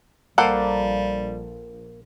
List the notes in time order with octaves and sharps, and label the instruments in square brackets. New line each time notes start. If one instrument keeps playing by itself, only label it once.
[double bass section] A#1 [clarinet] G3 [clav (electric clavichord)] A#3 [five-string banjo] A4 C5 F#5